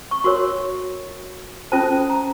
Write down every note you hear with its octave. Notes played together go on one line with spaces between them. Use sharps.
C#6
F#4 A#4 C#5 C6
C#4 F4 A4 C5 A5
A#5